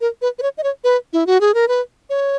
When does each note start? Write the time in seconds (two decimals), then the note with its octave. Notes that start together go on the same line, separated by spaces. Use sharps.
0.01 A#4
0.22 B4
0.39 B4
0.43 C#5
0.58 D#5
0.64 C#5
0.84 B4
1.13 E4
1.27 F#4
1.41 G#4
1.54 A#4
1.68 B4
2.10 C#5